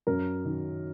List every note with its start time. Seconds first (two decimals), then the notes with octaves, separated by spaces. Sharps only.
0.07 F#2 A#4
0.45 D#3